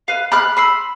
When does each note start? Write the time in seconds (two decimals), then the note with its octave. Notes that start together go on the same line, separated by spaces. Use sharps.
0.08 B4 F5
0.32 B5 F6 F#6
0.57 B5 C6 E6